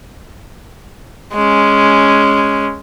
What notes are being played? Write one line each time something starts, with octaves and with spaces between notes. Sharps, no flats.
G#3 C#4